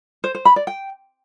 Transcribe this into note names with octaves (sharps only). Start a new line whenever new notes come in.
C5
C5
B5
D5
G5